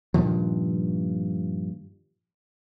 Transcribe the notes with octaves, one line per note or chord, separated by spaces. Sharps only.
G2 A#2 D#3 F3